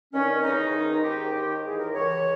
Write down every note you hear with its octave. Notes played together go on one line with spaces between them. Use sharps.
G2 D#3 C#4
D#2 C#3 E3 D#4
G#2 D#3
G#2 D#3 G4
D#2 D#3
G#2 E3 G#4
A#4
C#2 C#3 E3 C#5